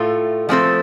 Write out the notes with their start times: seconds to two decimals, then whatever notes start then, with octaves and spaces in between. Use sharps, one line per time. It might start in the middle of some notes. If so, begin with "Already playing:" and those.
Already playing: A2 A3 F4 A4
0.49 F3 A3 C4 A4